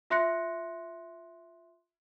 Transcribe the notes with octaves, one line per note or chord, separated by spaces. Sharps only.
F4 E5 C6 F#6 A#6 C#7